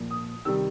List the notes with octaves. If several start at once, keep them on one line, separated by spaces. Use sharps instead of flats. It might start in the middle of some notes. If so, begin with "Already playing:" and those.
Already playing: A#2 F3
D#6
C3 D#3 G3 E6